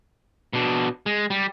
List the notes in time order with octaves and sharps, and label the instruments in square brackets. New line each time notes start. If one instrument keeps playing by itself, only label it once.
[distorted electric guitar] B2 D4
G#3
G3